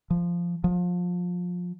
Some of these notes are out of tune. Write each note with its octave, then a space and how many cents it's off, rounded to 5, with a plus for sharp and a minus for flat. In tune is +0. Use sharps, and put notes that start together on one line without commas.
F3 -10
F3 +25